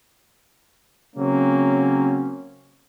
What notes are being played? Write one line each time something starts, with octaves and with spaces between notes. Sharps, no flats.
C#3 F#3 A#3 C4 C#4